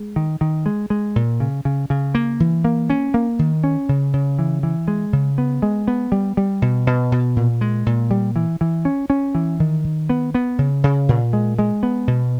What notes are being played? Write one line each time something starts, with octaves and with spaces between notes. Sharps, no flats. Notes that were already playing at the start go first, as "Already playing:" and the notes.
Already playing: G#3
D#3
D#3
G#3
G#3
A#2
C#3
C#3
C#3
A#3
E3
A#3
C#4
A#3
D#3
C#4
C#3
C#3
E3
E3
G#3
C#3
B3
G#3
B3
G3
G3
B2
B2
B2
A#2
G#3
A#2
G3
E3
E3
C#4
C#4
E3
D#3
D#3
B3
B3
C#3
C#3
A#2
G#3
G#3
B3
B2